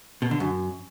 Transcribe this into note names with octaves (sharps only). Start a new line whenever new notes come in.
B2
D3
F#2